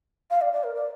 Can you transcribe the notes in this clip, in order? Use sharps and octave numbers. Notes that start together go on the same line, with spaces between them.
F5
D5
D5
A#4
D5